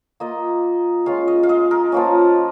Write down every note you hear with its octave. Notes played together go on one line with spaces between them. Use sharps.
A#3 F4 D#5
G#3 C#4 F4 F5
D#5
F5
D#5
A#4
F3 A#3 C#4